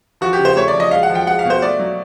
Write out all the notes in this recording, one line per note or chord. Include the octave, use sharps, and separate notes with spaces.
F3 F#4
G4
C#3
C5
A3 C#5
D5
F3
D#5
G#3 F5
F#5
F3
G5
G#3 F#5
F5
B2 C5
A3 D5
F#3